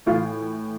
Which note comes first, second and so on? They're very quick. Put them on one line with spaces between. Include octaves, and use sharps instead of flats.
A2 F4 E3